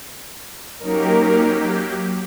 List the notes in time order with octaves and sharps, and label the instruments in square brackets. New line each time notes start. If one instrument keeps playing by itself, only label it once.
[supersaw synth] F#3 A#3 G4 [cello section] C#4 D#4 A#4